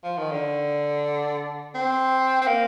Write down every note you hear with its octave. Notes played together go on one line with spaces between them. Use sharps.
F3
D#3
D3
C4
C4
A#3